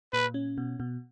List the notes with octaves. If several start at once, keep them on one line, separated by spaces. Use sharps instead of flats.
A#2 B4
C#4
B2
B2